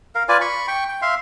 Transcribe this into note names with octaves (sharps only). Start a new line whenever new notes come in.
A#4 F5
F4 B4 D5 G#5
B5 C#6
G5 C#6
G5
E5 F5 C6